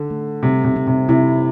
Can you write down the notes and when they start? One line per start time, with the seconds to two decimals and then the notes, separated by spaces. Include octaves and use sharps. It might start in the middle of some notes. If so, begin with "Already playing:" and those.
Already playing: D3 A4
0.10 A3
0.43 C3 G3
0.64 C3
0.76 C4
0.87 C3
1.09 C3 E4